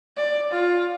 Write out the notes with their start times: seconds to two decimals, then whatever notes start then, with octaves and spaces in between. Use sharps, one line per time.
0.17 D5
0.51 F4